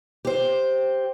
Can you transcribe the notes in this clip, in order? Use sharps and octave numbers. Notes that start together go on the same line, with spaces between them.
G4 C5